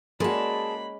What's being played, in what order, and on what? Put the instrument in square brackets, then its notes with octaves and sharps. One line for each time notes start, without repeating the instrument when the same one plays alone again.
[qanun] G#3 C#4 D5 [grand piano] A#3 F#4 [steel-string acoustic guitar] G#4 A5 [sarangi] B5